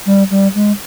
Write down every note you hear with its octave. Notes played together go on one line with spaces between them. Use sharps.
G3
G3
G#3